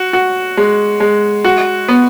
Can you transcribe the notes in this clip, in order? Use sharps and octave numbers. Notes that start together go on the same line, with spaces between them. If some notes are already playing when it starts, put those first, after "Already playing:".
Already playing: F#4
F#4
G#3
G#3
F#4
B3